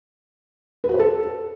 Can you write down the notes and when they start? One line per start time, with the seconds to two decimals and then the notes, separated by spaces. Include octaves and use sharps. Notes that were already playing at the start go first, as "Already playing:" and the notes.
0.84 B4
0.89 F#4
0.94 C5
0.99 A4